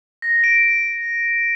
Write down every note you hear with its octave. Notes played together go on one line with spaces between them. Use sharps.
A#6
D7